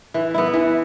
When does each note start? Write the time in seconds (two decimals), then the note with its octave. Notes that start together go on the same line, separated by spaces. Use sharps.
0.14 E3
0.34 B3 E4
0.54 E3